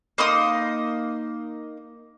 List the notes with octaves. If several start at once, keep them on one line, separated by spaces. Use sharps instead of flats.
A#3 D#4 C6 D#6